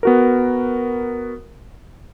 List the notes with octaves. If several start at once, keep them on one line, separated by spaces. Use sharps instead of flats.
B3 F#4 A#4